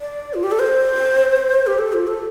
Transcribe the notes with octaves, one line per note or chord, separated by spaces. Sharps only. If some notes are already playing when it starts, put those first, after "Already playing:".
D5
F4
G4
A4
C5
G4
A4
F4
A4